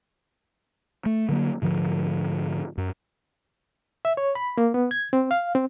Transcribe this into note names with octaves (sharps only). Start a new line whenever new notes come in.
A3
D3 F#3 A#3
G#2 D3 F3
F#2
E5
C#5
B5
A#3
B3
G#6
C4
F5
C4